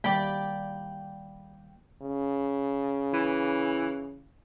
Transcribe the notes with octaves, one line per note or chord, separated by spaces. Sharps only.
D#3 G3 A#3 D5 G5 B5
C#3
E3